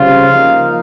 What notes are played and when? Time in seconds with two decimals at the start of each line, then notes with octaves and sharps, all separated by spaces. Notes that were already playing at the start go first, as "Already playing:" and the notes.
Already playing: C#3 G3 C4 F4 F5
0.31 F3 A#3 D#4